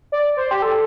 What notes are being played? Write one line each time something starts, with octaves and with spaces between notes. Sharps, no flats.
D5
C5
G4
A4